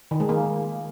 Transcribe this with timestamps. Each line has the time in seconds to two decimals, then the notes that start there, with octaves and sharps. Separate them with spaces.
0.11 D#3
0.20 G#3
0.29 A#3